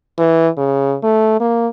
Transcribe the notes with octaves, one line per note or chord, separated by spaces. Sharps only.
E3
C#3
A3
A#3